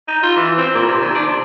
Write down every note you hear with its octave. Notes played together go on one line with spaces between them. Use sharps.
D#4
F4
E3
C4
A#2
C3
D#3
D4
C3